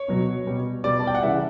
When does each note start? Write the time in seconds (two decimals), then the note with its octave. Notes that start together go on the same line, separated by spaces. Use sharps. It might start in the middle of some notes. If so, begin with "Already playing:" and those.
Already playing: C#5
0.08 B2 F#3
0.46 B2 G3
0.84 B2 G3 D5
1.00 A5
1.07 G5
1.15 F#5
1.23 C#3 E3 G3 E5